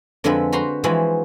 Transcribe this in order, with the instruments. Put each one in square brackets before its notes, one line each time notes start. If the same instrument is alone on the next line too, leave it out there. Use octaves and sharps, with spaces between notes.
[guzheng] F2 D3 F3 G#3 A4 B4
F#4 B4 C5 A#5 C6
E3 F3 G#3 F#4 B4 C5